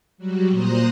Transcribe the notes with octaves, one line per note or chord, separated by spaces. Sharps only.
F#3 G3 F#4
A#2 C5 A#5 C6 D#6 F#6